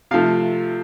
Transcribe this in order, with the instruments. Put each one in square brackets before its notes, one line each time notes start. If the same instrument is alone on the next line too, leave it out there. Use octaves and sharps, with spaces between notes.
[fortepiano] C3 F3 A3 F5